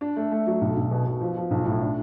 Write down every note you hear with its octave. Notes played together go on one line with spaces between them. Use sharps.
D4
A3
A3
F#3
B1
B1
B2
B2
F3
F3
B1
A2
D4